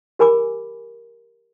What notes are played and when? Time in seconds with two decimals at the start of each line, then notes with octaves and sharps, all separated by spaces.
0.19 G4 A#4 G#5 B5 D6